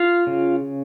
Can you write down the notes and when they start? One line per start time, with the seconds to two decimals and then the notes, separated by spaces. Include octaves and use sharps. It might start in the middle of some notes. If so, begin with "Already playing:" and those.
Already playing: F4 F5
0.27 C#3